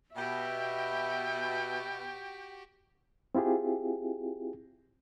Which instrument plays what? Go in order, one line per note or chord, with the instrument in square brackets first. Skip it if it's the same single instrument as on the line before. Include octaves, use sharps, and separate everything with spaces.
[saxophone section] B2 [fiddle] F#4 G4 [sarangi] E5 [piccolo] G5
[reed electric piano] C4 E4 F4 G4 G#4